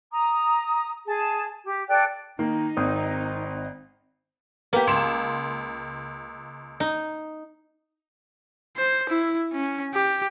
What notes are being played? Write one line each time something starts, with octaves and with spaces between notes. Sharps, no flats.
A#5 D#6
G#4 A5
G4
A4 D5 G5 F#6
D#3 A#3 D#4
G#1 C4 D#6
A#3 B3 G4
C#2 C6 E7
D#4
C5
E4
C#4
G4